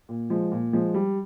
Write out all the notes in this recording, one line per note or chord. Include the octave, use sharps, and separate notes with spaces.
A#2
F3 G#3
A#2
F3 G#3
G3